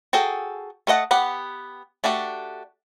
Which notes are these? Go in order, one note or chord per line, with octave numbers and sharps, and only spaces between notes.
F#4 G#4 A4 G5
A3 A4 D#5 F#5
B3 G4 F#5
A3 D4 F#4 G4